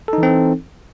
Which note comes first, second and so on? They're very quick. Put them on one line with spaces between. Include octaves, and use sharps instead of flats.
A4 D#4 E3 C4